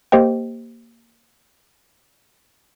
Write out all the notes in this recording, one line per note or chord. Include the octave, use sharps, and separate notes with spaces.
A#3 G4 C5 D#5 G5